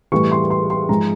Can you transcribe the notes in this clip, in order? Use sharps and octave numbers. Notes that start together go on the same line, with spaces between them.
A2 E3 G3 C#6
C6
C6
C6
G#2 F3 G#3 A#5